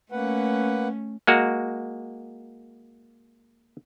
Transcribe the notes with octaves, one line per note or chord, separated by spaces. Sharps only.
A3 A#3 C#4 B4 F#5
G#3 A#3 F#4